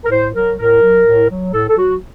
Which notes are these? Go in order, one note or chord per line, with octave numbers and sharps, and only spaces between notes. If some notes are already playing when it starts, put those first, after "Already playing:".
A#4
A2 C5
F#3 A#4
A2 A#4
F#3
A2
F#3
A2 A4
A4
F#3 F#4